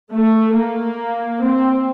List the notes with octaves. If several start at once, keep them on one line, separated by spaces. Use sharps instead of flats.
A3
A#3
C4